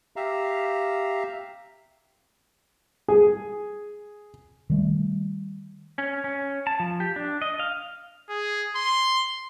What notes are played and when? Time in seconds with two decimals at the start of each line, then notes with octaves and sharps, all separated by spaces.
0.16 G4 E5 F5 A#5
3.08 G#4
4.70 D#3 G3 A3
5.98 C#4
6.24 C#4
6.67 A5
6.80 F3
7.00 G4
7.16 D4
7.42 D#5
7.60 F5
8.30 G#4
8.76 C6